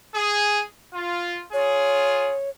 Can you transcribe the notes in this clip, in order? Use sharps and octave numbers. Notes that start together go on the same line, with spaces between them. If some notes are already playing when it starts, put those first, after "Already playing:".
G#4
F4
F4 G#4 C#5